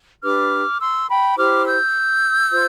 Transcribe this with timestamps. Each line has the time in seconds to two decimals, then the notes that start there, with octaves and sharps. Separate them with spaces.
0.22 D4 G4 B4 D6 F6
0.80 C6 E6
1.09 G5 B5
1.37 E4 G4 C5 D6 F6
1.66 E6 G6
2.51 F4 C5